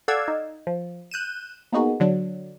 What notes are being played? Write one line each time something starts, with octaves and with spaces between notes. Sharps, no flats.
A4 D5 F5 F#5 E6 G#6
D#4
F3
F#6 G6 D#7 E7
A#3 B3 D#4 F#4 G#4
D3 F#3 D4